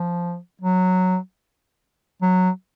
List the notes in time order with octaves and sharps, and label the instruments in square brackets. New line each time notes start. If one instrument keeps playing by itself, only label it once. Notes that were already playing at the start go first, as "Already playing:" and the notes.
Already playing: [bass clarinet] F3
F#3
F#3